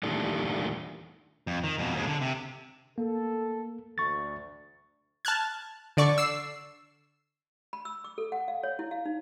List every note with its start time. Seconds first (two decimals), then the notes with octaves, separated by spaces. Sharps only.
0.03 A#2 D#3 E3 G3 A3 D4
1.47 F2
1.64 D#3
1.78 F2 B2
1.95 D#2 G#3
2.07 D3
2.21 C3
2.98 A#3 A4
3.98 D2 C#6 A6
5.25 A5 F6 F#6 G#6
5.97 D3 D5 C#6
6.18 E6 C7
7.73 B5
7.85 E6
8.04 D6
8.18 A4
8.32 F#5
8.48 F5
8.63 C#5
8.79 E4
8.91 F5
9.06 D#4